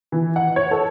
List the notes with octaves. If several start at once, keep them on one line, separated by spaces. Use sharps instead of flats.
E3
F#5
C#5
A4